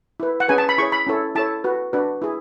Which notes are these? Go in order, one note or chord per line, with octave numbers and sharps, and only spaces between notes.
E4 B4
F#5
C#4 G#4 B4 G#5
A5
B5
E4 G#4 C#5 C#6
B5
C#4 E4 A4 C#5
E4 A4 C#5 A5
F#4 B4
D4 F#4 B4
E4 G#4